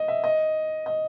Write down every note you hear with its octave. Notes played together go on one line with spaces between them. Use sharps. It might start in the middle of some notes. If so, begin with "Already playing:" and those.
Already playing: D#5
E5
D#5
D#5